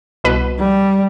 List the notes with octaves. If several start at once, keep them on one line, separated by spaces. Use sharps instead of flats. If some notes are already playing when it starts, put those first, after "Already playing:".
C2 B2 B4
G3